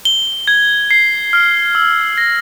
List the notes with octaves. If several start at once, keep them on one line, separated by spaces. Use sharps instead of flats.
G7
G#6
C7
F6
E6
A#6